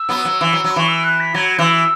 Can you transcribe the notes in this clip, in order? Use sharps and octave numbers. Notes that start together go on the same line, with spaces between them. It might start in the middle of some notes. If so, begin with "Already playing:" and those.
Already playing: E6
F#3 B3
F#3
E3
F#3
F#3
B5
E3 C#6
E6
F#6
B6
F#3 G#6
E3 E6